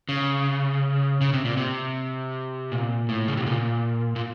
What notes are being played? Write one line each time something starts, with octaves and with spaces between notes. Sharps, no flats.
C#3
C#3
C3
A#2
C3
A#2
A2
C#3
C3
A#2
A#2